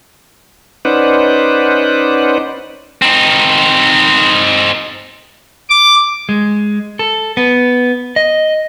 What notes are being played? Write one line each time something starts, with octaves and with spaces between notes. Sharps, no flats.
C#4 D#4 B4 C5 D5 F#5
C4 D#4
D6
G#3
A4
B3
D#5